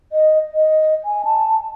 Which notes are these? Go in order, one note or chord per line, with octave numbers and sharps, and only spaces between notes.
D#5
D#5
G#5
A5